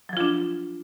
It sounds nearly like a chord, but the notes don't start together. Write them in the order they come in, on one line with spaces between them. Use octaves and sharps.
F#3 F3 F4 D4